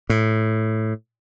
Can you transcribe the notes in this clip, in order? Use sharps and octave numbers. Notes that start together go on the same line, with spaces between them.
A2